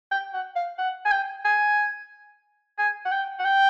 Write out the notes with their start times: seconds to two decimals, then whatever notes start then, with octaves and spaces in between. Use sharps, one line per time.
0.11 G5
0.33 F#5
0.56 F5
0.78 F#5
1.05 G#5
1.11 G5
1.45 G#5
2.78 G#5
3.05 F#5
3.11 G5
3.39 F#5
3.44 G5